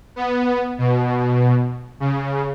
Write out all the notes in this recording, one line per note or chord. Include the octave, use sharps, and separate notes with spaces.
B3
B2
C#3